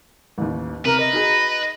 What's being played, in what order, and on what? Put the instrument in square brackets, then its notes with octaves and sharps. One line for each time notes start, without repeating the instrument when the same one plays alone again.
[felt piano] A1 D#2
[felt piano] C3 [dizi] A#4 [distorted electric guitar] B4
[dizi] D#5
[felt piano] D#4 F#4 G#4